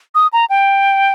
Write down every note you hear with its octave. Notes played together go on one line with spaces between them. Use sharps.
D#6
A#5
G5